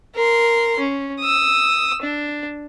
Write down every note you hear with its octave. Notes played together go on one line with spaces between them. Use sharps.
A#4 C6
C#4
D#6 E6
D4